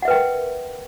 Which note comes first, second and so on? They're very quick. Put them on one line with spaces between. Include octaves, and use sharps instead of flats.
F#5 E5 B4 G5 A#4